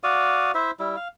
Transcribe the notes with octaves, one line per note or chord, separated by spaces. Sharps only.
F#4 D5 F5 D#6
E4 C5 E5
G3 E4
F5